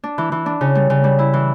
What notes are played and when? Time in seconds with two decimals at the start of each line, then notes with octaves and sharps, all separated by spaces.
0.04 D4
0.18 E3
0.32 E3
0.46 D4
0.61 C#3
0.75 G3
0.90 C#3
1.04 G3
1.19 E4
1.34 E3